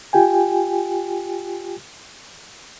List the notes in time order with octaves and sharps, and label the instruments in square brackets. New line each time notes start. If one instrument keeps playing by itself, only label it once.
[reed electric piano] F4 G4 G5 G#5